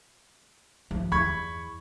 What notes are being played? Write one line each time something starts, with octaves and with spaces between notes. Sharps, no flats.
F3
E2 B5 C#6 G#6